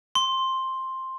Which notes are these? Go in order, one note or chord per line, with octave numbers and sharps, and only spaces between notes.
C6